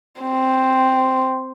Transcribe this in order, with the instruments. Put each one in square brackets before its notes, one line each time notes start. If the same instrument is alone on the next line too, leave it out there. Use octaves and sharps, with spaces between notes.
[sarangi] C4